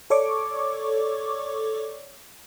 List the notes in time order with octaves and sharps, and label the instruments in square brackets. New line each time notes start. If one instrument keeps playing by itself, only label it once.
[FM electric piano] A4 C#5 D5 C#6 D6